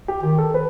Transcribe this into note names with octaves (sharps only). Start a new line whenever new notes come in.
G4
D#3 G4
A4
B4